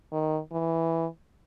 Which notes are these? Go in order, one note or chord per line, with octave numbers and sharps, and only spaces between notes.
D#3
E3